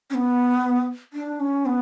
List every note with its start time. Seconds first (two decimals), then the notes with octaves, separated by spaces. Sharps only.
0.10 C#4
0.14 B3
1.13 D4
1.40 C#4
1.66 B3